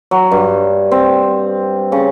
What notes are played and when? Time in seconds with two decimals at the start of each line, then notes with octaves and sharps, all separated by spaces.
0.11 F#3
0.31 G2
0.91 C4
1.92 C#3